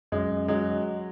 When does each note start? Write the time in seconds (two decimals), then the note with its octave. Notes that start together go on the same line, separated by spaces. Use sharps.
0.12 F#2 G#3
0.48 F#3 G#3